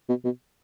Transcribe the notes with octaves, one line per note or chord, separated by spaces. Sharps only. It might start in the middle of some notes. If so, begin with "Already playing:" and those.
B2
B2